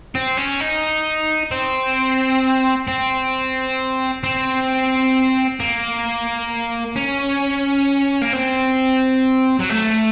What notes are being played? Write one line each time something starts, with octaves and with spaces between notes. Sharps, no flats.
C4
C#4
D#4
C4
C4
C4
A#3
C#4
A#3
C4
F#3
A3